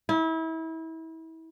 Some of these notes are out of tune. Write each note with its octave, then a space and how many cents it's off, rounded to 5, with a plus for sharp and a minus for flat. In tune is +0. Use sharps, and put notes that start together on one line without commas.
E4 -30